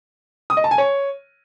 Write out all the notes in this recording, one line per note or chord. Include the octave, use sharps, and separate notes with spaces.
D#6
D#5
A5
G#5
C#5